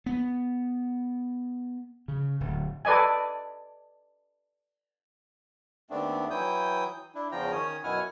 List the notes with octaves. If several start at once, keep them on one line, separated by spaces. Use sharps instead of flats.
B3
C#3
D1
A4 B4 D5 D#5 G#5
D#2 A3 B3 C4 D4
E3 F#3 E4 G5 D#6 G6
D4 E4
E2 C#3 F3 F4 G5 A#5
D#3 C#4 C#5 D#6
F#2 B2 E4 F#5 G#5 F6